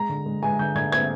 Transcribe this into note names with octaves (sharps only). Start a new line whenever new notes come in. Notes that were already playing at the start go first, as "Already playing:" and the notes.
Already playing: G#3 A#5
D3
G#3
G#3 G#5
D3 G6
D3 G#6
C4 G#6